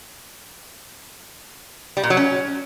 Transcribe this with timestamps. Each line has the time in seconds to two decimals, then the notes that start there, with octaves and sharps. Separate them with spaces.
1.97 G3
2.03 A#2
2.10 F#3
2.17 C#4